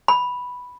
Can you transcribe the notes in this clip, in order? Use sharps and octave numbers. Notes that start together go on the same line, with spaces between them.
B5